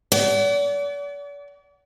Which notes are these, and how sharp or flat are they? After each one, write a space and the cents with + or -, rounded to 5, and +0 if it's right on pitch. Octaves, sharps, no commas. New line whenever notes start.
D5 -40 F#5 +25